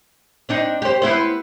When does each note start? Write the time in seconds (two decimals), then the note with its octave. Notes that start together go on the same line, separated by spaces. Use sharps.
0.49 C4 D4 D#4
0.82 G4 C5
1.02 B3 E4 C5